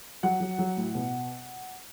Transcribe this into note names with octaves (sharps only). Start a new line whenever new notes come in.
F#3 F#5
F#3
F#3
A2
B2